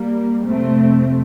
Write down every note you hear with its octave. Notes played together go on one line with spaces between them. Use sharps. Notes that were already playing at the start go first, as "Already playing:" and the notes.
Already playing: G3 A#3
F2 C3 A3 C4